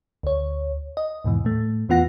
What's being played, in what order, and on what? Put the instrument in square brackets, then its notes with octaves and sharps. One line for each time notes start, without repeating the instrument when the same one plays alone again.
[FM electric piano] D2 C#5
D#5
D#2 G#2 B2 E3
A2 A3
E2 E3 B3 F4 F#5 A#6